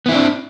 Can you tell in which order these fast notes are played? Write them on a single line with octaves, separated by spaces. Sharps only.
B3 E4 C4 D4